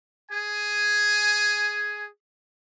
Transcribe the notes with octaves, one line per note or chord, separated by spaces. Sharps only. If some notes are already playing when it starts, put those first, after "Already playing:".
G#4 G#5